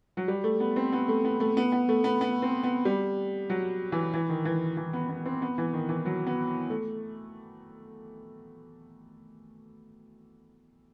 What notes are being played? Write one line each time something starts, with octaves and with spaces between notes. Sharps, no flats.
F#3
G3
A3
B3
C4
B3
A3
B3
A3
B3
B3
A3
B3
B3
C4
B3
G3
F#3
E3
E3
D#3
E3
E3
B3
B3
C4
B3
E3
D#3
E3
F#3
B3
A3